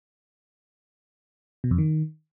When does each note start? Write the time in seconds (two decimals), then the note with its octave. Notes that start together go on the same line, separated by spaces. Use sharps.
1.64 B2
1.71 F2
1.78 D#3